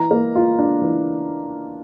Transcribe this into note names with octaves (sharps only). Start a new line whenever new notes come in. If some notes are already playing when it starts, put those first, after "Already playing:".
Already playing: E3 A#5
A#3
F4
D4
E3